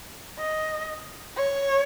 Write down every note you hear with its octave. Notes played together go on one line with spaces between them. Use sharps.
D#5
C#5